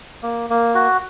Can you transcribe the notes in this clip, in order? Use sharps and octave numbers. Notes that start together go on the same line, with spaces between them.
A#3
A#3
F#4